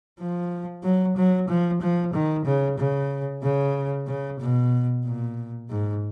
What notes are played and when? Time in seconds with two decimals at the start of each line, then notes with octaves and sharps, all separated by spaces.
0.19 F3
0.83 F#3
1.17 F#3
1.48 F3
1.81 F3
2.13 D#3
2.45 C#3
2.78 C#3
3.43 C#3
4.07 C#3
4.40 B2
5.05 A#2
5.70 G#2